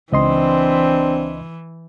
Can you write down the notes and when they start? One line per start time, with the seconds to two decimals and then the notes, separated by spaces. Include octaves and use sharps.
0.12 C#2 E3 C4 D4 D#5 C6